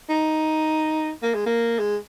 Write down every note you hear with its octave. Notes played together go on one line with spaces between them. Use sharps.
D#4
A#3
G#3
A#3
G#3